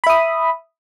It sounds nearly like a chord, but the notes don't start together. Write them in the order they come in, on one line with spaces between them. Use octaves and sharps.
B5 E5 D#6